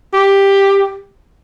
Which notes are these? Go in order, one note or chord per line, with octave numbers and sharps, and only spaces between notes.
G4